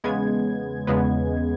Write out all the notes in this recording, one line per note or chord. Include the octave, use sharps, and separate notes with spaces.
E2 C#3 G#3 B3 G#6
E2 C#3 G#3 B3